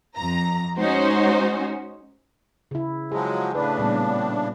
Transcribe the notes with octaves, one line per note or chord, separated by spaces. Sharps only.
F2 A#5
G#3 C#4 D#4 F#4 C5
C#3 E4
F3 F#3 G#3 G#4
A2 C#3 D4 B4
A#2 G3 B3